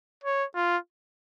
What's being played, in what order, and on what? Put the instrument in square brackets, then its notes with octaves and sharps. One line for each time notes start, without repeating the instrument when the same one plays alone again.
[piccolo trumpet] C#5
F4